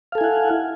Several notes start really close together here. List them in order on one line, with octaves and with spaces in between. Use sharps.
F5 A4 G#5 E4 F#5